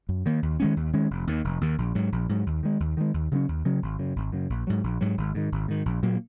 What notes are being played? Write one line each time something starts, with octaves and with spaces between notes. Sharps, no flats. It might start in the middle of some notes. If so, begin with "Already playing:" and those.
F#2
D#3 A#3
D#2
D#3 G#3 C#4
D#2
D#3 G#3 C#4
F1
D#2 D#3
F1
D#2 D#3
A#1
G#2 F#3
A#1
G#2 F#3
D#2
D#3 G#3
D#2
D#3 G#3
D#2
C#3 F#3 C#4
D#2
C#3 F#3 C#4
G#1
F#2 C#3
G#1
F#2 C#3
A#1
G#2 F#3
A#1
G#2 F#3
G#1
G#2 D#3
G#1
G#2 D#3
A#1
A#2 F#3 A#3